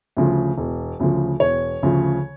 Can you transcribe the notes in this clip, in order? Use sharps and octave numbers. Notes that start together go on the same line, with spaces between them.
D2 C#3 F3
E1
D2 C#3 F3
E1 C#5
D2 C#3 F3